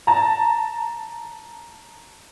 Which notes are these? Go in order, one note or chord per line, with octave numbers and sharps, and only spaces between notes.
A5 A#5